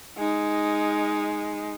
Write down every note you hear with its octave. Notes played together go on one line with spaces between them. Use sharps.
G#3 D#4